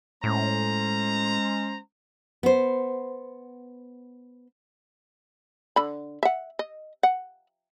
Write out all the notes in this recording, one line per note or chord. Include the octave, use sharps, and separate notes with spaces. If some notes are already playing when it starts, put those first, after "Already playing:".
A2 G#3 C#4 C5 A#5
B3 C5
D3 B5
E5 F#5
D#5
F#5